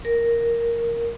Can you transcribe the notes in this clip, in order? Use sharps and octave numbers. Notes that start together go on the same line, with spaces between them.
A#4